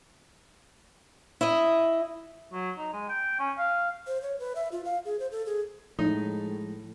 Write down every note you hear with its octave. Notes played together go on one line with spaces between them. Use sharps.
E4 D#5
F#3
D#4
G#3
G5
C#4
F5
C5
C#5
B4
E5
F4
F5
G#4
C5
A4
G#4
A2 F3 G#3 D#4